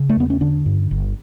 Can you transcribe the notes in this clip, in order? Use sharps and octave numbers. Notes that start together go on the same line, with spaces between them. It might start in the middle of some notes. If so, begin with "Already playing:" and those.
Already playing: C#3
A3
E2 B3
C#4
D3 D4
G2
G1